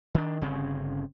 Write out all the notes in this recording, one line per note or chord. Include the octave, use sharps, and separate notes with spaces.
D#3 D4
G1 C#3 C4 C#4